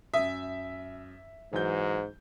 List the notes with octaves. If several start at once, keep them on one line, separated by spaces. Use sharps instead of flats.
F#2 E5 D#6
G#2 E3 F#3 G6